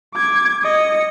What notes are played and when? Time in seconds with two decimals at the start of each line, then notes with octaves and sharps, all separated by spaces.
0.15 D6 G#6
0.63 D#5 C#7